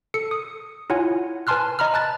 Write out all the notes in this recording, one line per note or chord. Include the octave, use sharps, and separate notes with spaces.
A4 C#7
D#6
E4 F4 C#5 F#5 G#5
B4 G#5 A5 C6 F6 F#6
D#5 A#5 B5 F6
A5 F#6 A6